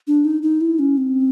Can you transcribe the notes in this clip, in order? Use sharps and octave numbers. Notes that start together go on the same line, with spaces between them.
D4
D#4
D#4
E4
C#4
C4